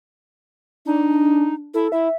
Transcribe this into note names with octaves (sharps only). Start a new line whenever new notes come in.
D4 D#4
E4 A4
E4 E5